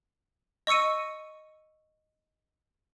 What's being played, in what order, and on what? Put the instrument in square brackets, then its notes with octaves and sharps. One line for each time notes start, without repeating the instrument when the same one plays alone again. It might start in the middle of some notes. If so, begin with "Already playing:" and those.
[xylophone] D#5 C#6 E6 C#7 D#7